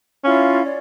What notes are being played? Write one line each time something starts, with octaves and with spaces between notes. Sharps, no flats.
C#4 E4 F4 F5
C#5 D5